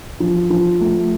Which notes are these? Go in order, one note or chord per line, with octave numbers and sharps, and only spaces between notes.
F3
F3
A3